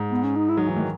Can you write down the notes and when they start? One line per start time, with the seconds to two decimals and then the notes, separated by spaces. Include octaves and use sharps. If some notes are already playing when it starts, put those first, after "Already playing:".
Already playing: G#2
0.11 B3
0.24 C#4
0.36 D#4
0.49 E4
0.57 F#3 D#4
0.67 E3
0.76 D#3 A3